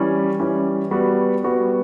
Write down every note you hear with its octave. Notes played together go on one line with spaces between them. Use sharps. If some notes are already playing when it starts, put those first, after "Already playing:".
Already playing: E3 G3 C#4
E3 G3 C#4
G3 B3 F#4 B4
G3 B3 F#4 B4